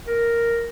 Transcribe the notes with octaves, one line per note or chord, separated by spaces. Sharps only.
A#4